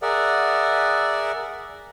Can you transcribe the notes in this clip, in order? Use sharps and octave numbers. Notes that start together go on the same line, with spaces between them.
G#4 A#4 D5 E5 F#5